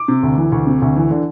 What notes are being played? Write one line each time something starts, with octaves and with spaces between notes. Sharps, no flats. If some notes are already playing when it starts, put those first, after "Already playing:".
Already playing: D6
C3
D2
E3
D2
C3
D2
E3
D3